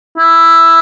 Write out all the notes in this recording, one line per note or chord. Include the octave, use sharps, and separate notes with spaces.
E4